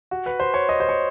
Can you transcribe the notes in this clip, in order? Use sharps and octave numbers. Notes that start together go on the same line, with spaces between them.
F#4
B4
C5
C#5
D#5
C5
C#5